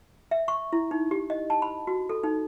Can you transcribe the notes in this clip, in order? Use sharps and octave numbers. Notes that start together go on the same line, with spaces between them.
E5
C#6
E4
D#4
G4
D#5
A5
B5
F#4
A4
D#4